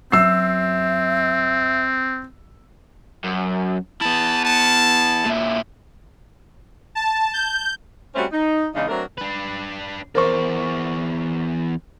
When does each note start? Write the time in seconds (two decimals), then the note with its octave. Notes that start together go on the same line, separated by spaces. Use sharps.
0.12 F#2 F#3 C4 E5 E6 C7
3.24 F#2
4.01 B3 E4 A5
4.45 A5
5.26 A#2 E4
6.95 A5
7.33 G6
8.14 G3 A3 C4 C#4 F#4 C5
8.31 D#4
8.75 E2 C#3 G#3 D4 D#4
8.88 F#3 A3 C4 D4 A#4
9.18 D4 B4
10.15 E2 A#4 C5 D5 C#6